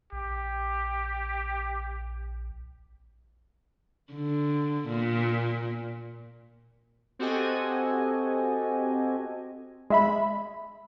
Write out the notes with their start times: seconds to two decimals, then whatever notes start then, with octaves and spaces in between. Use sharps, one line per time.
0.12 A#1 G4
4.13 D3
4.88 A#2
7.19 C4 F#4 G4 A4 D#5 G#5
9.90 G#3 E5 B5